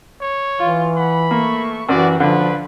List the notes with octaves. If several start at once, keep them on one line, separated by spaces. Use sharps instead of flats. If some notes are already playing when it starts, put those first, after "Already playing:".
C#5
E3 F4
F#5 B5
A3 A#3 C#6
F#2 E3 F#4 G4 D5
D3 F3 F4 B4